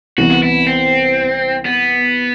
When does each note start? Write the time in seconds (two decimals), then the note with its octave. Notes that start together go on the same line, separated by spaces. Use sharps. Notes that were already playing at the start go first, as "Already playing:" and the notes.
0.18 C2 C3 E3 B3 F#4
0.43 E4
0.67 C4
1.65 B3